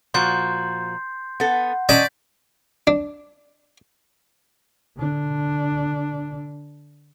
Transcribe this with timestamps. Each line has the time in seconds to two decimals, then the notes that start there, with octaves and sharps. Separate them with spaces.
0.14 A#2 F3 F#4 C6 G6 C7
1.40 B3 A4 F#5
1.89 C#4 D5 D#5 A5 G6 B6
2.87 D4
4.97 D3 D4